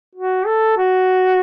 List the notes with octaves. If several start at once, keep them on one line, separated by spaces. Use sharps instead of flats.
F#4
A4
F#4